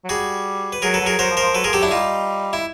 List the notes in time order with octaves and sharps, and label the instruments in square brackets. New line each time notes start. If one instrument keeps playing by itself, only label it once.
[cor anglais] F#3
[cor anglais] G3 [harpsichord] F#4 G#4
[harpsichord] B4
[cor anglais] F#3 [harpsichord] G#4 A#4
[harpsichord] A4 B4
[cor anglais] F#3
[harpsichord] G#4 A#4
[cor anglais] F#3 [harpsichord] A#4 C5
[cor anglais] F3
[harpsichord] A#4 C5
[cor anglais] F3
[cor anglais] F#3 [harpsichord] A4 B4
[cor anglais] F3 [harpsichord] G#4 A#4
[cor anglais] F#3 [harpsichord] G4 A4
[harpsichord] D4 E4
[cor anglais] G3 [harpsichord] D#4 F4
[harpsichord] E4